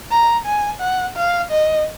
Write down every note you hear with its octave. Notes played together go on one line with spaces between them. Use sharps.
A#5
G#5
F#5
F5
D#5